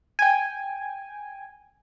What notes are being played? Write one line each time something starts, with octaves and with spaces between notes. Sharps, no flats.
G5 G#5